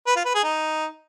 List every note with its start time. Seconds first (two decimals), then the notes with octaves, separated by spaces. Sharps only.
0.06 B4
0.16 F4
0.25 B4
0.34 G#4
0.44 D#4